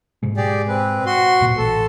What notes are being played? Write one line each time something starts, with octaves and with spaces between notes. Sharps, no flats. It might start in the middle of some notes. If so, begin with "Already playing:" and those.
G#2 B2 G#3
G4 G#4 D5
C4 B4
F#4 C6
D1 A#2
A1 A4